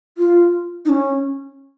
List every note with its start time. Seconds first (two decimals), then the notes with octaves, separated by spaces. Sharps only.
0.18 F4
0.86 D#4
0.89 C#4